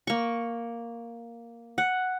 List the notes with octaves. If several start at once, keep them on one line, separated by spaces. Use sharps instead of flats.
A#3 C#6
F#5